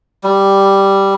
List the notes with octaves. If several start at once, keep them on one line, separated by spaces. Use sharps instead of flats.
G3